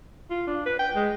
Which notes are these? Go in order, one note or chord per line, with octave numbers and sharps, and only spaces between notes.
F4
D4
B4
G5
G#3